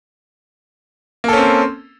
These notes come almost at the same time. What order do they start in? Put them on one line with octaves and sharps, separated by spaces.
A#3 A4 C#4 C4